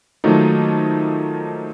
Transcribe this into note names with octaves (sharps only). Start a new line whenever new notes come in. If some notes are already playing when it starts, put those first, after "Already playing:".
D#3 F3 F#3 A3 A#3 D#4